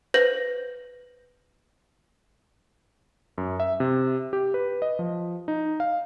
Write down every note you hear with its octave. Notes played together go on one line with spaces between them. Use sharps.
B4 C5 G6 A#6 F#7
F#2
E5
C3
G4
B4
D#5
F3
D#4
F5